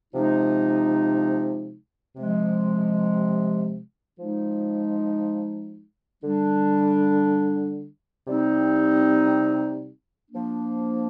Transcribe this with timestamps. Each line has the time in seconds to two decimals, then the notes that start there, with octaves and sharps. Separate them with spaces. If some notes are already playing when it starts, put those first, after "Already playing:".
0.13 C3 F3 G#3 D#4
2.16 C3 F3 G#3
4.19 F3 G#3 D#4
6.23 D3 G3 D4
8.26 C3 G3 C4 D#4
10.30 F3 A#3 D4